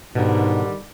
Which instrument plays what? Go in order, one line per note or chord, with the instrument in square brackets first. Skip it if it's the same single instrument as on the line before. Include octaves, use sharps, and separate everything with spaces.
[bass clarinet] G#2 [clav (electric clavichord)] B2 [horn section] D3 D#3 G3